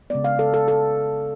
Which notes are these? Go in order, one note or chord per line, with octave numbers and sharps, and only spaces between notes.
C#3 G#3 B3 D5
F5
A4
A4
A4